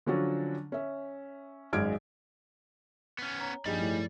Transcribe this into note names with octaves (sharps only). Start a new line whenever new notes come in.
D3 F3 F#3 C#4 D4 F#4
C#4 E5
G#1 F#2 G#3 F6 G#6 D7
B3 C#4
C#5 G#5 A#5
A#1 G2 F3 D#4 G4 G#4 D5 B5
A2